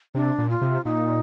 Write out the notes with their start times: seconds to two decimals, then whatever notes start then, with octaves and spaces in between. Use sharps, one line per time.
0.15 C3 D4
0.38 A#2
0.50 F4
0.61 C3
0.85 A#2 D#4